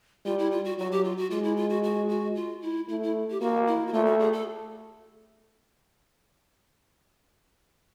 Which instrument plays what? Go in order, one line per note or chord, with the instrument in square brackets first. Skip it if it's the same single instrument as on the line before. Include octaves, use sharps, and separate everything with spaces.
[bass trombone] G3 [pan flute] F4
[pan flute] E4
F4
F#4
[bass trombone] F#3 [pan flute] F#4
[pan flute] G4
F4
F#4
[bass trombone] G#3 [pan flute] F4
[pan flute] E4
F4
F#4
F#4
F#4
F4
E4
[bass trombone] A3 [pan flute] E4
[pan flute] E4
G4
[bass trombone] A#3 [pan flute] F#4
[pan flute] E4
F#4
[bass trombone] A3 [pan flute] F4
[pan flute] F#4
G#4
A4